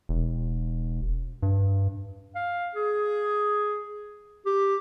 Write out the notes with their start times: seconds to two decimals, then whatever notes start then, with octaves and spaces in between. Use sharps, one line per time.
0.09 E1
1.43 G2
2.35 F5
2.75 G#4
4.46 G4